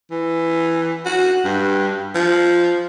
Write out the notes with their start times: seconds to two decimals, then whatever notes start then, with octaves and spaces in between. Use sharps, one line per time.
0.11 E3
1.05 F#4
1.45 G2
2.15 F3